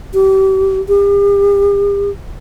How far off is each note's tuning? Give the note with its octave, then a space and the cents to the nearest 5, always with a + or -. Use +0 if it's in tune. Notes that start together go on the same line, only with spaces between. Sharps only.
G4 -30
G4 +40